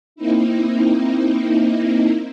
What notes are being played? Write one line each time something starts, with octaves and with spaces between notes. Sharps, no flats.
A#3 C4 D#4 E4